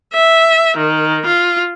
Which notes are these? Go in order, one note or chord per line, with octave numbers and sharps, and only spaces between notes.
E5
D#3
F4